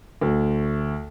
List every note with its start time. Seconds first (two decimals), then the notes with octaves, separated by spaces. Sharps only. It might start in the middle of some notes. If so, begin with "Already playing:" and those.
0.21 D2